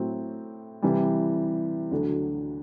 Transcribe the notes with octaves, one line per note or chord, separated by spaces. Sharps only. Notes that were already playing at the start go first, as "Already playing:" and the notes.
Already playing: A2 F#3 C4
C3 E3 G3
D2 D3 F#3